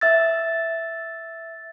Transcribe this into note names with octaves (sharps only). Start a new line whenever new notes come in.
E5 E6 A6